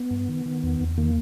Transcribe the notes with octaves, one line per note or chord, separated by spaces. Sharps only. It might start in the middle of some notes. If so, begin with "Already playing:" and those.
Already playing: B3
G2
D#3
D#3
E2
E2
D#3 A#3